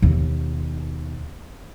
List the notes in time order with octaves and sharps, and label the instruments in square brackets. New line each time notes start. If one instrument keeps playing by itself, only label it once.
[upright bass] D#2 B2